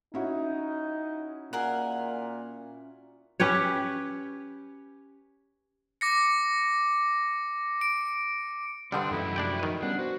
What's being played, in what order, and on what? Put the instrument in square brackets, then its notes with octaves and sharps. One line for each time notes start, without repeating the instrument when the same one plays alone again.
[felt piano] C#4 E4 F#4 [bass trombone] D#4
[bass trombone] A#2 [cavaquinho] G#4 A#4 F#5
[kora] C#4 G4 B4 C#5
[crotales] D6 A#6 C#7
D7
[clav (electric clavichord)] G2 D3 G3 [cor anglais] C4 [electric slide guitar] D4 [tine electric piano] F#5 D#6
[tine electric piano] F#2 A4 [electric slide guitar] E3 G#3 A3 [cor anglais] E4
[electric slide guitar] F3 F#4 G#4 [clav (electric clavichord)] D4 D5 G5
[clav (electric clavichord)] D#3 B4
[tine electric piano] G3 B3 C#4 [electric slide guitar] D4 [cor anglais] F#5
[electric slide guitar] F#4 [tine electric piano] C5